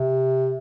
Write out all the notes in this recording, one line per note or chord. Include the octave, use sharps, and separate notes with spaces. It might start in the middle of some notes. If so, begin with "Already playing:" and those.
Already playing: C3